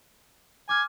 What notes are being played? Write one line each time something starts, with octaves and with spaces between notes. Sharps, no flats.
G#5 D6 F6